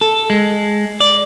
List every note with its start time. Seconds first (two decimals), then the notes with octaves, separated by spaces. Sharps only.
0.01 A4
0.30 G#3
1.00 D5